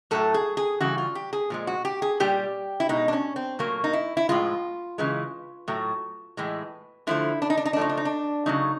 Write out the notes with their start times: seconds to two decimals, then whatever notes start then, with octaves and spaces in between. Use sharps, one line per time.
0.11 A2 F#3 A3 A4
0.34 G#4
0.57 G#4
0.80 C#3 E3 G3 F#4
0.98 F4
1.15 G4
1.33 G#4
1.50 A#2 F3 G#3
1.67 F#4
1.85 G4
2.02 G#4
2.20 A#2 G3 G4
2.80 E4
2.89 B2 G#3 D#4
3.08 D4
3.13 C#4
3.36 C4
3.59 A#2 F#3 A3 A#3
3.84 D#4
3.93 E4
4.17 E4
4.29 A2 F3 G#3 F4
4.98 C#3 E3 G#3
5.68 A2 F#3 A3
6.37 A2 E3 G#3
7.07 D3 F3 A3 E4
7.42 D4
7.50 D#4
7.57 D4
7.65 D#4
7.73 D4
7.76 C#3 F3 A3 D#4
7.89 D4
7.97 D#4
8.05 D4
8.46 C#3 F#3 A3 D#4